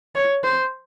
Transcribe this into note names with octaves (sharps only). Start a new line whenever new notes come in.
C#5
C5